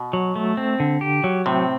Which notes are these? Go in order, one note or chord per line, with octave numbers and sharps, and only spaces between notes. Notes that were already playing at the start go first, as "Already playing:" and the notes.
Already playing: B2
F#3
A3
C4
D3
G4
F#3
A2 C3 C4